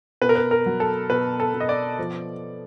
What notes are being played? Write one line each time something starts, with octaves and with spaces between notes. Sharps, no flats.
B2 B4
A#4
B4
A#4
F#3
A4
B2 B4
A4
B2
D#5
D5
F3